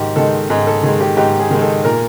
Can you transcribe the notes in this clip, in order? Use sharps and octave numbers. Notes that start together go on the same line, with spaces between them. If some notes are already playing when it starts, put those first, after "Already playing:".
Already playing: G#2 D#3 G4
D#3 G#3 A4
G#2 G#4
A4
D#3 G#3 G#4
G4
G#2 G4
G#4
D#3 G#3
A4
A#2 A#4